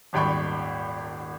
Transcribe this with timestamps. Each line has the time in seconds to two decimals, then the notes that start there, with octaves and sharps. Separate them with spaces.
0.13 D#1 G#1 G3 G5 B5 C#6